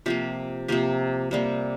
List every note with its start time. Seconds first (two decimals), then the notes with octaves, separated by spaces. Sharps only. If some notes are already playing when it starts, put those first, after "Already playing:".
0.06 C3 F3 A#3 G4
0.68 C3 F3 A#3 G4
1.31 C3 G3 A#3